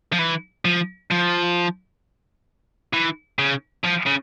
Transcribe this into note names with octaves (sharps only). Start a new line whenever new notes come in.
F3
E3
F3
F3
E3
C#3
F3
C#3